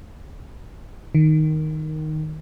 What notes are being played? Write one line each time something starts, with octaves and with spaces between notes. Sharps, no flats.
D#3